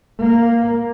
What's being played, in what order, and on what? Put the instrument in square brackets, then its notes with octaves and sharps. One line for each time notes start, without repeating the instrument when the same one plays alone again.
[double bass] A#3